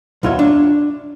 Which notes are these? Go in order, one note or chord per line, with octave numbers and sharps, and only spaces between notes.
B1 E2 F4 F#4 C#5 E5
D4